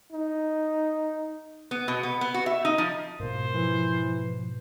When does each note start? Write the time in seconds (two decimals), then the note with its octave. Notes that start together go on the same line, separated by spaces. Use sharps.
0.12 D#4
1.71 B3
1.88 B2
2.03 B3
2.21 B3
2.34 F#4
2.46 E5
2.65 D#4
2.78 F3
3.20 G#2 B2 A#3 C5
3.54 E3 F3